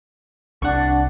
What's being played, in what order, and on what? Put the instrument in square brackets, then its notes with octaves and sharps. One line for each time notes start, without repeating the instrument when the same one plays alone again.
[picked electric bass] C2 [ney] D4 [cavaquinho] F#5 C#6